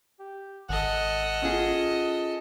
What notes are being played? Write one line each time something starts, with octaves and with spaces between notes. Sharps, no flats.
G4
G#1 A4 D#5 F#5
C#4 F4 G#4